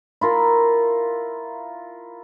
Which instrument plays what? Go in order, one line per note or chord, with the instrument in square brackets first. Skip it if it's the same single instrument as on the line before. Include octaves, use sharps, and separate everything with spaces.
[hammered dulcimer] E4 F4 A#4